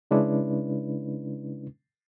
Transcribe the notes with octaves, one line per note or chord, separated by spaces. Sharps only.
C#3 G#3 C#4 D4 E4 B4